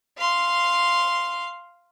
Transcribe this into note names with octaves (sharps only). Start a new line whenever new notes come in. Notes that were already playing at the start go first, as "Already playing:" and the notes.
F5 C6